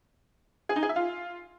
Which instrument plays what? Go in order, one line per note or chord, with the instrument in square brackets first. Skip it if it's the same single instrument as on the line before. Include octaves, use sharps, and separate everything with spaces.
[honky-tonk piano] G#4
D#4
G#4
E5
F4